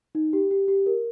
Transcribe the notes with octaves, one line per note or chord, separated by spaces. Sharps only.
D#4
G4
G4
G4
A#4